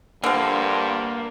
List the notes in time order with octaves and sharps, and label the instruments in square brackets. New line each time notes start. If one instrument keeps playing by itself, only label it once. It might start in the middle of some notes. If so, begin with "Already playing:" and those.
[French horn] G2 [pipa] D3 F3 [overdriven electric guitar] A#3